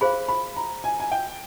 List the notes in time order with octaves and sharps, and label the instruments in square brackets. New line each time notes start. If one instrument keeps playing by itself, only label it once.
[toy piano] G#4 C5 F5 [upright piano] B5
[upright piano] B5
A#5
G#5
G#5
G5